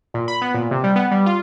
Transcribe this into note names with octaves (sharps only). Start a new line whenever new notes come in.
A#2
B5
B3
A#2
C3
G3
B3
G3
F4